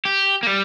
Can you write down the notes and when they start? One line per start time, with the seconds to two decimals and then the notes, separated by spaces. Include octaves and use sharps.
0.05 G4
0.43 A#3
0.47 G3